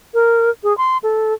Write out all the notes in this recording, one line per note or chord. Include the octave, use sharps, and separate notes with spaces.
A#4
G#4
C6
A4